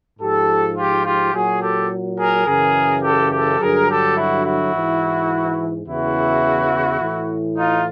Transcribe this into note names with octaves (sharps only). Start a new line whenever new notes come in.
G#2 F3 G4 A4
F4 G4
F4 G4
A#2 F#3 F#4 G#4
G4 A4
G#4 A#4
F#2 C#3 E3 G#4 A#4
G4 A4
G4 A4
G2 D3 F#3 G#4 A#4
G4 A4
E4 F#4
E4 F#4
G#2 E3
E2 C#3 E3 E4 F#4
A2 E3
D#4 F4